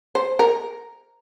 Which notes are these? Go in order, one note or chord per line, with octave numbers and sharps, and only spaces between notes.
C5
A#4